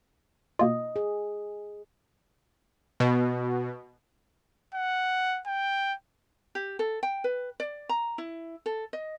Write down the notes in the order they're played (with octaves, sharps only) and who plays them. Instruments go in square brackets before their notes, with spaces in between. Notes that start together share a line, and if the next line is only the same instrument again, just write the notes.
[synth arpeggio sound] B2 A#3 F4 [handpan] D#5
[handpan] G#4
[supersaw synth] B2
[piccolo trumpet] F#5
G5
[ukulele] G4
A4
G5
B4
D5
A#5
E4
A4
D#5